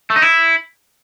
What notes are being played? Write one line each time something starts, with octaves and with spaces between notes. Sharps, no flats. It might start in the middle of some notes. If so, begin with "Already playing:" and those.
A3
D#4
E4